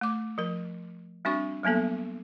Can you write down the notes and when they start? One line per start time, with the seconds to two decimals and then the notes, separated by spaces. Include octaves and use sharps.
0.01 A3 D6
0.38 F3 A#4
1.25 G3 C4 D4 F#4 C#6
1.63 F#3 G3 A#3 B3 A4